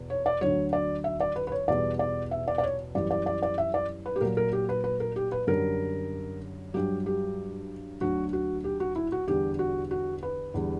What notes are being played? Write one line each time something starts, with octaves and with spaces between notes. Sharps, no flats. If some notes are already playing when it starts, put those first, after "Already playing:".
Already playing: E2 B2
C#5
D5
D2 D3 F#3 C#5
D5
E5
D5
B4
B4
C#5
E2 B2 G3 D5
D5
E5
D5
D5
C#5
F#2 E3 G3 D5
D5
D5
D5
E5
D5
B4
G4
A#2 F#3 A#4
A#4
G4
B4
B4
A#4
G4
B4
F#2 D3 G3 A#4
G2 F#3 G4
G4
D2 D3 F#3 F#4
F#4
G4
F#4
E4
F#4
E2 D3 G3 G4
F#4
F#4
B4
E2 D3 G3